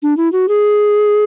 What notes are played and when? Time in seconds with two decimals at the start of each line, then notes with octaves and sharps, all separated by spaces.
0.02 D4
0.17 E4
0.32 F#4
0.48 G#4